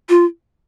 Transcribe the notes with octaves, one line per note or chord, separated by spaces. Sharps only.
F4